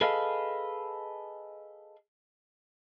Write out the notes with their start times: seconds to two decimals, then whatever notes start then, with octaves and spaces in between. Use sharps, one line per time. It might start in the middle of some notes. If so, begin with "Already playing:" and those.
0.01 G#4 A4 B4 D#5 F5